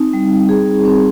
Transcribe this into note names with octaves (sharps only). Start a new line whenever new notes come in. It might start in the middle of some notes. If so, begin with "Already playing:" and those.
Already playing: C4 D#4
G3
G#4
C4